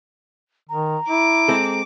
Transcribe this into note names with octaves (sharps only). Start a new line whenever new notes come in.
D#3 A#5
E4 D6
G#3 C4 A4